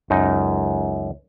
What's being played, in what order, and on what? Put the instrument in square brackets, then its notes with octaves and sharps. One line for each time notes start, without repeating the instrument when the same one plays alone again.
[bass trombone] C#2 [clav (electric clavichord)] F#2 D#4